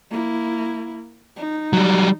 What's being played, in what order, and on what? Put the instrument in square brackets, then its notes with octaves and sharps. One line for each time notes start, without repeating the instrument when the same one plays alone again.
[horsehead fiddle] A#3 E4
D#4
[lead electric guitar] F#3 G3